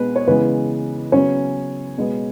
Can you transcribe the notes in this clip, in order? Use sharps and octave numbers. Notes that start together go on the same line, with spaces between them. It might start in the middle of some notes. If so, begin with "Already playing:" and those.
Already playing: B2 G#3 B3 B4
C#5
C#3 E3 G#3 B3 B4
C#3 F#3 B3 C#4 C#5
B2 G#3 B3